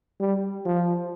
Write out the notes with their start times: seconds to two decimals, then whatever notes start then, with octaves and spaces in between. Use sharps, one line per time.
0.20 G3
0.66 F3